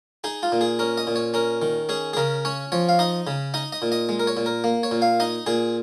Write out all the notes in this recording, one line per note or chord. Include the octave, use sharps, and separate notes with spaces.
D#4 G#4
F4
A#2
G#4
C#4 A#4
D#5
A#2
C#5
C#4 A#4
D#3
C#4 G#4
G#4
C#3 A#4
C#4 C#5
F3 C#5
F5
D#4 D#5
C#3
D#4 D#5
D#5
A#2
D#5
G#3
A#4
C#5
A#2
A#4
A#3
C#5
A#2
F5
D#4 D#5
A#2 G#4